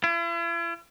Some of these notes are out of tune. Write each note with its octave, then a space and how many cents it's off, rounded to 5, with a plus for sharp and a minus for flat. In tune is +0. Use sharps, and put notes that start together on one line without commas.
E4 +45